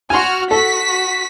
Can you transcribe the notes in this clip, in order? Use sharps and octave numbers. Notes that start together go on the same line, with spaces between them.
F#4 G#5 C6 F6
F#4 A4 B6